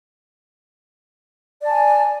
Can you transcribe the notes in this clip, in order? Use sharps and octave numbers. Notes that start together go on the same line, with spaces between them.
D5 G#5 A5